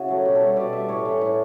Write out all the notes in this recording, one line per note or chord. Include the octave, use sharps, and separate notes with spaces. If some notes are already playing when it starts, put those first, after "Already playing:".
Already playing: C#3 E4 F#4
F#3 A3
B2 G4
A4
G3 C#5
B2 D5
G3 E5
D5
A2 C#5
E3 A3
A2